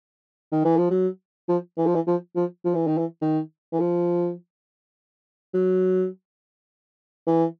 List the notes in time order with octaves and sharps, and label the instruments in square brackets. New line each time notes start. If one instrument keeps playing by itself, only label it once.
[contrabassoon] D#3
E3
F3
F#3
F3
E3
F3
E3
F3
F3
F3
E3
D#3
E3
D#3
E3
F3
F#3
E3